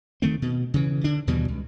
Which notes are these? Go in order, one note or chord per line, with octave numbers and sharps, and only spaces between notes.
D#3 A3 C4
B2
C#3 E3
D3 D4
D#2 B2 E3 G3
C#2